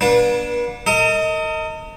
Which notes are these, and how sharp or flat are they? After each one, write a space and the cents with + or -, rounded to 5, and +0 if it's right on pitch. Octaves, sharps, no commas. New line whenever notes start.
B3 -45 D4 +0 B4 -35
A#4 -45 D#5 +20